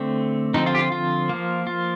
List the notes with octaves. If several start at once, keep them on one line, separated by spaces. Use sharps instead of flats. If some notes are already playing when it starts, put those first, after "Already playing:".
Already playing: D3 A3 C4
D3 F3 C4 D#4
F4
G4
F4
F4
F3 A#3
F4